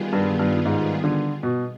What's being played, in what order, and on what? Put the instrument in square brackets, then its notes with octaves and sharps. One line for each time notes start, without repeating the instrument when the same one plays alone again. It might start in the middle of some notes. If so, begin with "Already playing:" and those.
Already playing: [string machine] D#3 G3 B3 F4 G#4
[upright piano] G2
G2
G#2
D3
B2